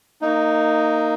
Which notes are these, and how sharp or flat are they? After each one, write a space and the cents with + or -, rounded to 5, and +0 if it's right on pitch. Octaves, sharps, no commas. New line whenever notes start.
A#3 -20 D#4 +0